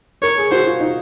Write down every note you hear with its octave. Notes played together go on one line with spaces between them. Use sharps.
A#4 C#5
G#4
F#4 C5
F4
D#4